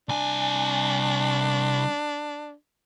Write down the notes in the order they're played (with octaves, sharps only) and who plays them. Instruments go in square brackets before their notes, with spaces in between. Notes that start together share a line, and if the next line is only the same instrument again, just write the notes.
[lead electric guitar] C2 G#5 [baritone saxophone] D4